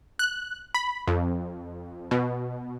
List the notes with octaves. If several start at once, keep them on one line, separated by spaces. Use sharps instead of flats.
F#6
B5
F2
B2